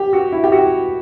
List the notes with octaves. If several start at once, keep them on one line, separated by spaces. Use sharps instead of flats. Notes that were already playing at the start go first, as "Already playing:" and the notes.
Already playing: G4
F#4
E4
G4
F#4